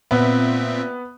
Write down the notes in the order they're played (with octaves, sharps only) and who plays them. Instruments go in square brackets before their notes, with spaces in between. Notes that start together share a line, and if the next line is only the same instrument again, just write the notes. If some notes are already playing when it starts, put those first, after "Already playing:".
[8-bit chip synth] A#2 C4 E5 [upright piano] B3